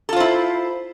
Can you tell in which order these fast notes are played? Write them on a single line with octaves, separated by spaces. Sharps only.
A4 F4 C5 E4